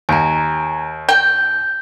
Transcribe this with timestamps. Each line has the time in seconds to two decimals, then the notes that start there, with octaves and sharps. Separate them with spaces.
0.09 D#2 G#5 A#5
1.09 G5 G6